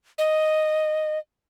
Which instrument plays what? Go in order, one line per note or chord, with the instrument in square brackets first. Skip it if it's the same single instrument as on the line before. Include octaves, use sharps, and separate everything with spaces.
[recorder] D#5